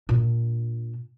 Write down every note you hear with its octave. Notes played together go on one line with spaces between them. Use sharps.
A#2 D4